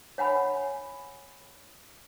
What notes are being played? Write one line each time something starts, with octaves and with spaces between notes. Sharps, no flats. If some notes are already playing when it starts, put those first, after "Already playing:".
C#5 F#5 G#5 B5